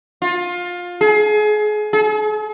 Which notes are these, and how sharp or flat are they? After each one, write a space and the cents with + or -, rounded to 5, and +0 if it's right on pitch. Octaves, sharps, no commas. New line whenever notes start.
F4 +20
G#4 +30
G#4 +45